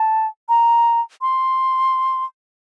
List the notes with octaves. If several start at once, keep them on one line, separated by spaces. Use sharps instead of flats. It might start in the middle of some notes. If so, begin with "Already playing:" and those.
Already playing: A5
A#5
C6